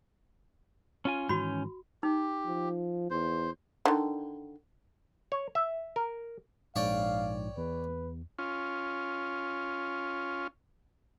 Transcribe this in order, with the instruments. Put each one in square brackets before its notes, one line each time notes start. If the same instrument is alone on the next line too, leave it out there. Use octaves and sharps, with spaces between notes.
[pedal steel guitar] C#4 F4 G#5
[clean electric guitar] G#2 D#3 E3 [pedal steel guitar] C#4 G6 [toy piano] F#4 B5
[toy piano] D#4 [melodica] G4
[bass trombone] F3
[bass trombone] E2 [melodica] C5
[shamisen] D3 D#3
[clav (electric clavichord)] C#5
E5
A#4
[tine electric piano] A#1 G#2 [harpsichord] C#5 D5 G5 [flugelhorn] F5
[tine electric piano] E2 [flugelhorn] B4
[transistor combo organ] C#4 F4